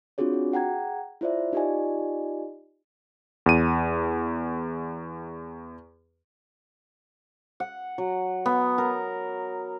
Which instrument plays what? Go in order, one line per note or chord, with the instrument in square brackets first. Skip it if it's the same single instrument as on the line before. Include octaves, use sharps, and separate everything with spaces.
[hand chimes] C4 D4 F4 F#4 G#4 C#5
F#4
G#4 F#5 G5 A#5 G#6
E4 F4 C5 D5 E5
D#4 F4 G4 D5 D#5 G#5
[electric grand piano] E2 D#7
[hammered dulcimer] F#5
F#3
B3
A#4